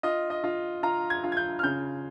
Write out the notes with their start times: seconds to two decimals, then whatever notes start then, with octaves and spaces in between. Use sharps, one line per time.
0.03 F4 D#5
0.30 D#5
0.44 F4
0.83 F4 A#5
1.10 G#6
1.24 F4
1.32 G#6
1.37 G6
1.59 F6
1.63 C#3 G6